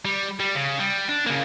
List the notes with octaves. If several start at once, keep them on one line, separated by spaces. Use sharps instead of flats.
G3
G3
C#3
G3
D4
C#3 A#3